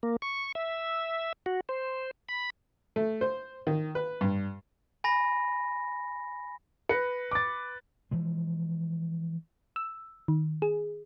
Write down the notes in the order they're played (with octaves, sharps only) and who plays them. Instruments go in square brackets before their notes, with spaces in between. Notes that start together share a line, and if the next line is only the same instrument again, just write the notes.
[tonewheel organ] A#3
C#6
E5
F#4
C5
B5
[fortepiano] A3
C5
D#3
B4
G2
[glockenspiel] G#5 B5 A#6
[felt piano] B4 A#6 [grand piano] C#7
[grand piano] D6 A6
[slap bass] E3 F3 G#3
[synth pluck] E6
D#3
G#4